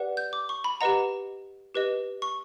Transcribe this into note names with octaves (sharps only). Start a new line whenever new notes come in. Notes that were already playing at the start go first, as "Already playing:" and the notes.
Already playing: G4 B4 D5 F#5
G6
D6
C#6
B5
G4 B4 D#5 F#5 A#5
G4 B4 D#5
C#6